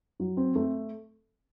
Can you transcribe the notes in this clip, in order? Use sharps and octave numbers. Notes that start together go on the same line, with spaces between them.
F#3
C4
A3